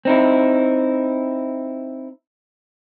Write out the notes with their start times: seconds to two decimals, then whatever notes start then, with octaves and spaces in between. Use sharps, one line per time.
0.05 C4 D#4 E4